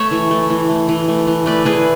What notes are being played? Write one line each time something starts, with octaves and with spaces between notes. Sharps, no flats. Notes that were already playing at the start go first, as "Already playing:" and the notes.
Already playing: A3 C#5 E5
E3
A3
E3
A3
E3
A3
E3
A3 B4 D5
E3 G#4 B4